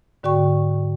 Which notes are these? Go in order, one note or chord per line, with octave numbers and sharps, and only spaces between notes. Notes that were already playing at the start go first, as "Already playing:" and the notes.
G#2 D3 F#4 D5 G5 C#6